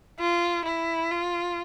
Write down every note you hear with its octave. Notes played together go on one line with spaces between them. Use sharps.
F4
E4
F4